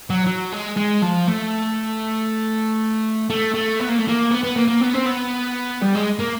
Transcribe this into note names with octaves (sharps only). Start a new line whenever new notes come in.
F#3
F#3
G#3
G#3
F3
A3
A3
A3
B3
A#3
A3
A#3
B3
B3
A#3
A#3
B3
C4
B3
G3
G#3
A#3